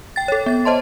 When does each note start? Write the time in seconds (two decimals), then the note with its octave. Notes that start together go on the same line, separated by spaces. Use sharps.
0.16 G5 A6
0.28 A4 C#5
0.46 B3 A6
0.65 C5 D#5 A5 C6